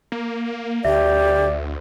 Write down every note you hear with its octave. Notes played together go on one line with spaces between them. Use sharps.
A#3
D2 G4 D5 E5